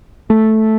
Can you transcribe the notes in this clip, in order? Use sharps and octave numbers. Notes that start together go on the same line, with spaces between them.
A3